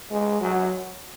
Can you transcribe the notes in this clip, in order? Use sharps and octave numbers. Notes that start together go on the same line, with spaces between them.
G#3
F#3